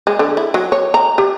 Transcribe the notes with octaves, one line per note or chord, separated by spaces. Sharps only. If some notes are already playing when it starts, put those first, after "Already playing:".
G#3
D3
E4
F#3
C#5
A#5
G4